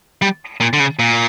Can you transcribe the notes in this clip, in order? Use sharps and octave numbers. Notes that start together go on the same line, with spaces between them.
G3
A#2
D3
C#3
A#2